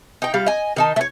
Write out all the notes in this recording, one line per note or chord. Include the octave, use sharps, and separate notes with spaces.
D#4 G5
G3 F4 F5
D#5 G#5
D#3 D#4 A5
A3 C#5